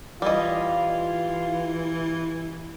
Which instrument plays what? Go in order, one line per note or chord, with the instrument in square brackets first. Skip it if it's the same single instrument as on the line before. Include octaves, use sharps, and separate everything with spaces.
[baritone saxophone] E3 [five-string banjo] G3 D#5 [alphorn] F4